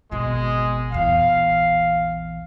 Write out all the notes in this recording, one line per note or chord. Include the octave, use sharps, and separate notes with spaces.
G#1 B2 G#3
A#1 E2 F5